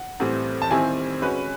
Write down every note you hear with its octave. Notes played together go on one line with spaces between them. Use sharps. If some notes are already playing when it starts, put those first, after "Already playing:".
Already playing: F#5
A2 E3 G3 C4
A5
D#3 G3 C4 E4 G4 G#5
G#3 C#4 F#4 B4